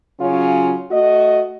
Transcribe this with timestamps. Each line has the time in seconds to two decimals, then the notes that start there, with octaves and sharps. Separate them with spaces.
0.20 C#3 F#3 C#4 F4
0.91 A3 F#4 D#5